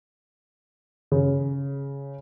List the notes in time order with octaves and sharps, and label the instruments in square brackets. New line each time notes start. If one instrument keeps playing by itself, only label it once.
[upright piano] C#3